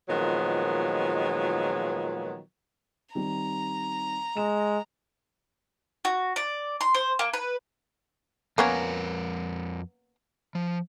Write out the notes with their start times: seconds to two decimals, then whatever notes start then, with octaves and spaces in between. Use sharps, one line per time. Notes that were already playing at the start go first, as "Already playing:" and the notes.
0.09 A#2 D#3 F3 F#3 G#3 B3
3.15 D#3 G3 C4 A#5
4.37 G#3 E7
6.05 F#4
6.36 D5
6.81 C6
6.95 C5
7.19 A#3
7.33 B4
8.58 F2 A#3 B3 C#4 A#4 A#5
10.55 F3